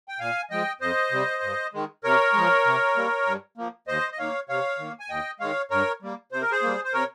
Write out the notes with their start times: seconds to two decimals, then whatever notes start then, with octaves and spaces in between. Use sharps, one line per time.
0.08 G5
0.19 A#2 F5 G#5
0.50 F3 G#3 D#5 G5
0.81 F2 C5 D#5
1.12 C3 G3
1.43 G2
1.73 D#3 G#3
2.04 C3 A#4 C#5
2.34 F3 G#3
2.66 C3
2.96 G3 A#3
3.26 G2
3.57 F3 A#3
3.87 D#2 C5 D#5
4.12 D#5
4.18 D#3 A#3 C#5 F5
4.49 C3 C#5 F5
4.79 D#3 A#3
5.00 G#5
5.09 D#2 D#5 G5
5.40 D#3 G#3 C#5 F5
5.71 G2 A#4 C#5
6.02 G3 A#3
6.32 C3 C5
6.42 A#4
6.51 G#4 C5
6.63 G3 A#3
6.84 C5
6.93 C3 A#4 C#5